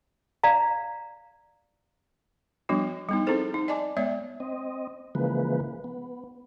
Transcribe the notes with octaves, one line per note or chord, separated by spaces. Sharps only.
D5 F5 A#5
F3 G3 B3 D4 F#4
G3 B3 D#4
C4 D#4 E4 G#4 A4 C5
D#4
D5 D#5 G#5 A5 D6
G#3 B3 C#5 D5 E5
C4 D#5
C#3 E3 F3 G#3 A#3 B4
B3